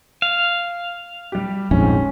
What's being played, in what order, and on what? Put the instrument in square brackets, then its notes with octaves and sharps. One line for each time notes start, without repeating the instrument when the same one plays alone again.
[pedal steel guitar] F5
[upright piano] G3 G4
[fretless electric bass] A#1 F2 G#2 [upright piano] C#4